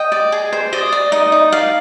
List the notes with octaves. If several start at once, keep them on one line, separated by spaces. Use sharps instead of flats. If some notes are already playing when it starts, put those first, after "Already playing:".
Already playing: D#5 G5
D5
G#4
C5
D5 D#5
D5
D#4 D#5
D#4
D5 F5